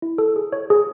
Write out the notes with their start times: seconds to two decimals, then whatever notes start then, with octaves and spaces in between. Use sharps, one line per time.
0.02 E4
0.18 A4
0.36 G#4
0.53 C#5
0.70 G#4